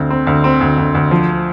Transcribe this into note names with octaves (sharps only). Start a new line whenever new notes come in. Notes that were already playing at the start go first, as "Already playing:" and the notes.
Already playing: D2 C4
C4
D2
C4
D2
D2
D2
F3